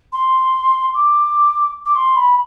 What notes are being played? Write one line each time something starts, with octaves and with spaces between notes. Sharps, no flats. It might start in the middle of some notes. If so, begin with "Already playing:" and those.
C6
D6
D6
C6
B5